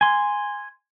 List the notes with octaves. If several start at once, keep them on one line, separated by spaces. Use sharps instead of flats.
G#5 C6